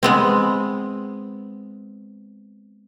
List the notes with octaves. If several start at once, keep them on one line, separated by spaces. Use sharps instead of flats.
G#3 B3 C4